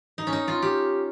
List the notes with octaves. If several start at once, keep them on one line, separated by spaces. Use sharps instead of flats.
D#4
C#4
D#4
F4
G4